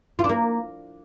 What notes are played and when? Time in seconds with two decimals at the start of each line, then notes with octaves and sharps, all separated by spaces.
0.19 F4
0.24 D4
0.29 A#3